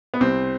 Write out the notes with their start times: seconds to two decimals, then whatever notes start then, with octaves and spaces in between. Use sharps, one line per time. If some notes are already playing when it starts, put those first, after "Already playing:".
0.14 B3
0.20 C2 C4